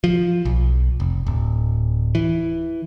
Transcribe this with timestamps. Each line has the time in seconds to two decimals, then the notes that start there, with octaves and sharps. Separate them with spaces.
0.04 F3
0.45 B1
1.00 F1
1.27 D1
2.15 E3